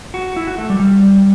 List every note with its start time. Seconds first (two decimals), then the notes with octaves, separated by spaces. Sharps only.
0.14 F#4
0.37 E4
0.47 F#4
0.58 A3
0.69 G3
0.80 G3